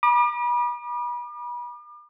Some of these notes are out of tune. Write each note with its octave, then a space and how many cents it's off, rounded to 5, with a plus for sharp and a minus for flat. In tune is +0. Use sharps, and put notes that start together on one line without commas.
B5 -35 D6 +40